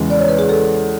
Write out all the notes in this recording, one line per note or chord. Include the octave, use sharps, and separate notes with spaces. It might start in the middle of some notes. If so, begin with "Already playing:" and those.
Already playing: E2 C#3 G#3
D5
C#5
B4
G#4
A4